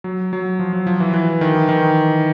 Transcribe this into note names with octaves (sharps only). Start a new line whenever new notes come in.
F#3
F#3
F3
F#3
F3
E3
E3
D#3
E3
D#3